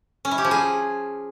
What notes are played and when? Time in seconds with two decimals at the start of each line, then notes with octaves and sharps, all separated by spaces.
0.25 C#4
0.31 E4
0.38 G4
0.45 F3
0.51 G#4